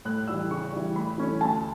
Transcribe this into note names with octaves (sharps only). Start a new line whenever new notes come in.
A2 F#6
E3 G3 E6
C#3 C#6
E3 G3
A2 B5
E3 A3 C#4
D2 A5